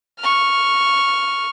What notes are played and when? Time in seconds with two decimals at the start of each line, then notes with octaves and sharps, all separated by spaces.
0.19 C#6 F6